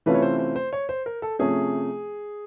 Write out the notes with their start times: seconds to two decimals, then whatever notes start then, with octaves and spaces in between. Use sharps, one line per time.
0.06 C3 E3 A3 C#4 F4 B4
0.14 C#5
0.22 C5
0.39 C5
0.56 C5
0.73 C#5
0.89 C5
1.06 A#4
1.22 A4
1.39 C3 F3 A3 C#4 G#4